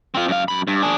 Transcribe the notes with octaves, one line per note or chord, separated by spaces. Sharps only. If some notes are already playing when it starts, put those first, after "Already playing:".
C4 F4
F#2 F5
F#2 B5
G2
D4 G#4